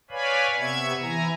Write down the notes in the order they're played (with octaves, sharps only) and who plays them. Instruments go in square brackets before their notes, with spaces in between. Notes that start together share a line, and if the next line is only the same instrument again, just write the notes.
[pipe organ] B4 C#5 D5 F5 G#5 B5
C3 B3 E5 C#6 G#6
E3 E4 G#5 A#5